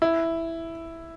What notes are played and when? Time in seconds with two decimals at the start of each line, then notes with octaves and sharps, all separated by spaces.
0.02 E4